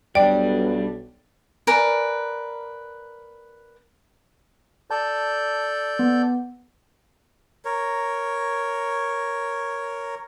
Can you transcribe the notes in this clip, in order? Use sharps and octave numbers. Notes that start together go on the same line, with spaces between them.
B1 G3 D4 D5 G5
A#4 B4 D5 G#5
A4 D5 A5 G6
B3
A#4 C#5